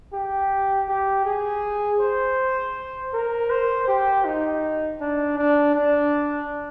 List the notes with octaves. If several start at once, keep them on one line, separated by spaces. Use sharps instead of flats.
G4
G4
G#4
C5
A#4
C5
G4
D#4
D4
D4
D4